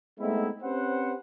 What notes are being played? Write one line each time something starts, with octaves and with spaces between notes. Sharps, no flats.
G#3 A3 B3 C4 D#4 E4
C4 C#4 G4 B4 C5 F#5